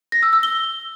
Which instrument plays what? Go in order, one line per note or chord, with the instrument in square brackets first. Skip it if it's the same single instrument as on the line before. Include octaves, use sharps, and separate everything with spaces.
[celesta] A#6
E6
E6
G7